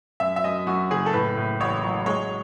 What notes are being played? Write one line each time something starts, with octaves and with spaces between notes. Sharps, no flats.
F#2 E5
E5
F#2 D#5
F#2 F#4
F#1 G#4
A4
A2 B4
A2
A1 C#5
F#3
G#3 C#5